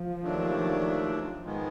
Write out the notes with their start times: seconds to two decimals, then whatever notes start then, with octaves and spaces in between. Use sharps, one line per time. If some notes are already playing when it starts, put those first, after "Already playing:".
Already playing: F3
0.23 D#2 D#3 F#3 A3 D4
1.44 G#2 D#3 G#3 B3